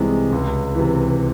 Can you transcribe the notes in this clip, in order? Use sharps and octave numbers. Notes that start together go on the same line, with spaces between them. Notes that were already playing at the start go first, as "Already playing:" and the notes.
Already playing: C2 C3 E3 G#3
C#2
C3 E3